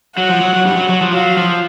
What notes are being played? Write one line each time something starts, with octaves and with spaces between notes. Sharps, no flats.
F#3 F#5
F3
F#3
F#3
G2 G3
F#3
F#3
F3
F#3 F5
F3